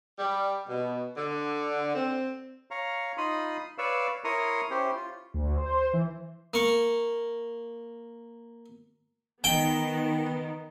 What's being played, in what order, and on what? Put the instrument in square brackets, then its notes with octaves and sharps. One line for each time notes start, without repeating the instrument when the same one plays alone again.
[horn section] G3
B2
D3
C4
[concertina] C#5 F5 A#5
D#4 F4 B5 C6 D#6
B4 C#5 D5 F5 E6
E4 A#4 C#5 A#5 C6 D#6
C#4 E4 G4 C5
F4
[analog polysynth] D2
C5
E3
[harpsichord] A#3 C#6
[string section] D#3 B3 [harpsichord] G5